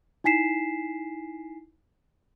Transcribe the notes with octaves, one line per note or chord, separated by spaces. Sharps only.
D#4 E4 G#5 B6 C7 E7